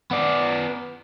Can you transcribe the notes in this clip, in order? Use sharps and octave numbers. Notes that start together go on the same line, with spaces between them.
B3 D5